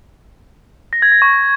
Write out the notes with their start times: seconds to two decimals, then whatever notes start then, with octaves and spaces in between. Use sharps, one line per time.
0.93 A#6
1.02 G#6
1.12 A#6
1.22 C#6